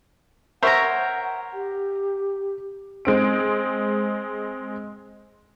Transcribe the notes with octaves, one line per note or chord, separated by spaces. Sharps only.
A#4 C5 C#5 E5 F#5 A#5 C#6
G4
G#3 C4 D7